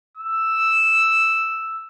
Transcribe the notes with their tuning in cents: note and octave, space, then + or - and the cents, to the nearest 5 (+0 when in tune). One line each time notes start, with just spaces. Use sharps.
E6 +0